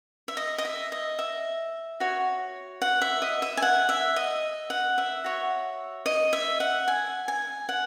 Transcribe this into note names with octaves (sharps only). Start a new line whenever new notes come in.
E5
D#5
D#5
E5
D#5
E5
F#4 C#5
F#5
E5
D#5
E5
G#5
F#5
E5
D#5
F#5
E5
F#4 C#5
D#5
E5
F#5
G#5
G#5
F#5